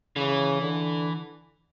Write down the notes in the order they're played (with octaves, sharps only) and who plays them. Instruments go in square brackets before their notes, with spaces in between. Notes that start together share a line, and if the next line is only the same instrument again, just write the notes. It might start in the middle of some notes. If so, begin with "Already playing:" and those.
[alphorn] C#3 [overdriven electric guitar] E3
[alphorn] D3